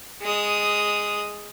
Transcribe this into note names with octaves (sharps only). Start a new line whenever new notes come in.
G#3 D#6